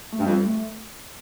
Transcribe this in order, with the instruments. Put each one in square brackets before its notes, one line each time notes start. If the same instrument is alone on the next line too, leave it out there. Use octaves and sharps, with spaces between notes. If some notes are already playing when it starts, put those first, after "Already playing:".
[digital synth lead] A3
[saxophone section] G2
[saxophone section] F2 [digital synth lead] G3
[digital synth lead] A3